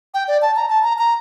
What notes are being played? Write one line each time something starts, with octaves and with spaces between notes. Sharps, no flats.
G5
D5
A5
A#5
A5
A#5
A#5